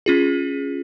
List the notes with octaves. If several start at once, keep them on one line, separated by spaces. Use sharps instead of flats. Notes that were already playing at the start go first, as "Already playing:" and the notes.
C#4 F4 G#4